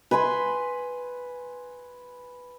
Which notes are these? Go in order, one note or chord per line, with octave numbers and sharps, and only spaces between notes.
B4 G#5 B5 C6